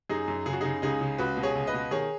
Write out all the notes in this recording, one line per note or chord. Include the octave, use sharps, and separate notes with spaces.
F#2 D#4 G#4
F#2
C#3 G#4
F#4
C#3 D#4 G#4
C#2 D#4 G#4
C#3
C#2 F#4 B4
B2
G#4 C#5
C#2
B4 D#5
B2
D#3 G#4 C#5